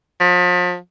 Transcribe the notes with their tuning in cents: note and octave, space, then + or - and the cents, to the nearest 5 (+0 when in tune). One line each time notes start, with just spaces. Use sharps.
F3 +40